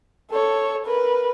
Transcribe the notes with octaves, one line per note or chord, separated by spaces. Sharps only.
A4 C#5
A#4 B4